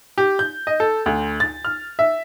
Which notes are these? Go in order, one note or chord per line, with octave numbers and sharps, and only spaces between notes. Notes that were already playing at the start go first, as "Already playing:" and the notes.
G4
G6
D#5
A4
D2
A6
F6
E5